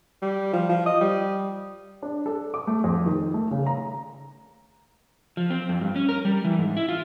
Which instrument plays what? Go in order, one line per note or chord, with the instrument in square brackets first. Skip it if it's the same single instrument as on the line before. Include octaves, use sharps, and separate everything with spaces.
[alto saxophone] G3
F3
F3
D#5
G3
[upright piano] D4
A4
D6
A3
F2
D#3
A3
C#3
A#5
[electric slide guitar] F3
C4
F2
G2
C#4
A#4
G3
E3
G#2
E4
F4